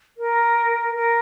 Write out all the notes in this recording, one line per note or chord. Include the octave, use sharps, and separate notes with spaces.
A#4
A#4